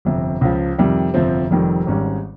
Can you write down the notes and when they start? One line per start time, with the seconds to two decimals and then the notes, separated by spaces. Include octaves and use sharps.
0.05 G1 F2 C3
0.41 C#2 C#3 F3
0.78 F2 C3 D#3 G3
1.14 G1 F2 C3 F3 C4
1.51 F1 F2 D#3 G3
1.87 G#1 G#2 G3 C#4